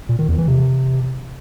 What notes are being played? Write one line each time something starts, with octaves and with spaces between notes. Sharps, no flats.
A#2
D#3
E2
E3
C3